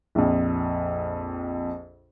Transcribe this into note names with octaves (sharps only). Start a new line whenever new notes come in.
A#1 F2